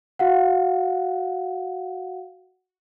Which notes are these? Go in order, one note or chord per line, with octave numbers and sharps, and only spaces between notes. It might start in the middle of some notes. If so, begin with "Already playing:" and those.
F#4 F5 F#5